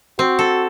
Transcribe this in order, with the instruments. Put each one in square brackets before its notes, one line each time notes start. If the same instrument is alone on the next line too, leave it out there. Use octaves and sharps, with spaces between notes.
[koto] C4 [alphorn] F#4
[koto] A4